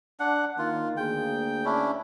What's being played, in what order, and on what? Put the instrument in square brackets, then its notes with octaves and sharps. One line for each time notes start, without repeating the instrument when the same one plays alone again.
[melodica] D4 F#5
[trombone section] D#3 A#3 [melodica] F4
[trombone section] D2 A#3 G#4 [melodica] G5
[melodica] C#4 D4 E4